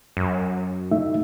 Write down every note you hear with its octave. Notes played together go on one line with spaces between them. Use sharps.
F#2
A3 D#4 E5